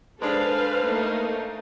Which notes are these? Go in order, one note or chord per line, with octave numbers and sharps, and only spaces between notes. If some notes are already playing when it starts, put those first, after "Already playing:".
G#3 D4 A4 B4 C5 F5
A3 A#3 D#4